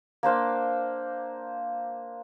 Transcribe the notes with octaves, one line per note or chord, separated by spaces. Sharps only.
A#3 D4 C5 F5